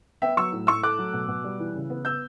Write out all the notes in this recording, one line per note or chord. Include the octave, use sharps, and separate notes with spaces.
B3 E5 G5
F#3 C#6 E6
A2
A2 C#6 E6
A3 D6 F#6
F#3
B2
B2
G3
E3
C#3
B3
B3 E6 G6